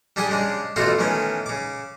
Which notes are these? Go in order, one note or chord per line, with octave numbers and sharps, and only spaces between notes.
G3 D4 G4 G#4 F#5
C#3 G#3 D4
A1 B2 A3 F4 F#4 A4
D#3 E3 A3 B3 C#4
C#3 D6